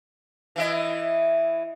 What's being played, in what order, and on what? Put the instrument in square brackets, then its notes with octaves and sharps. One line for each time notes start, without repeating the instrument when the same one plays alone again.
[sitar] E3 E4 D#5